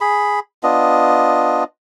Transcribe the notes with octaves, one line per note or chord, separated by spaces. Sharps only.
G#4 B5
B3 D4 F4 D#5